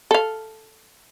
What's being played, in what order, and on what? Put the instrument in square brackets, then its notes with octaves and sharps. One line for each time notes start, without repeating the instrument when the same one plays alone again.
[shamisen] A4 F5